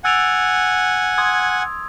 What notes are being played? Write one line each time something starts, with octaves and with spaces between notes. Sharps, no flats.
F#5 G#5 E6 A6 D7 F7
C6 D#6 G#6